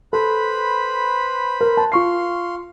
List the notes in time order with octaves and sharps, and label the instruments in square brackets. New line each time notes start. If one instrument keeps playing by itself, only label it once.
[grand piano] A4 [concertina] B4 C5 B5
[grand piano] A#4
A5
[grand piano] F4 C#6 C7 [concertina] F5 C6